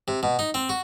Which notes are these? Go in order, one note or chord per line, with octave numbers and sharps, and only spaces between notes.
C3
B2
D#4
C4
F#4